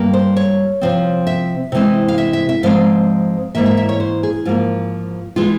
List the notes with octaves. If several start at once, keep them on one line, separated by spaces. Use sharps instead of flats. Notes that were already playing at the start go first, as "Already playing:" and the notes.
Already playing: G2 G3 A#3
C5
C#5
C3 F3 C4
E5
C3 E3 G#3 C4
F5
E5
E5
E5
G#2 F3 G#3 C4 F5
G#2 E3 A#3 E5
E5
E5
C#5
C5
G#4
G#2 F3 A#3 F4
E3 G#3 F4